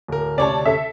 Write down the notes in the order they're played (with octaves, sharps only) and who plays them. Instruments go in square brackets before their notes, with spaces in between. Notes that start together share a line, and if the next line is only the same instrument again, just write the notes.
[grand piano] D1 A#4
[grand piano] D2 C3 C#5 [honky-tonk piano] D5 A5
[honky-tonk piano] A4 E5